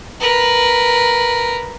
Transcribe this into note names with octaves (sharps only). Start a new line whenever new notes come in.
A#4 B4